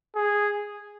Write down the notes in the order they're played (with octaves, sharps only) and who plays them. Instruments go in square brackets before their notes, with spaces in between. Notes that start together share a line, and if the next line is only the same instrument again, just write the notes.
[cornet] G#4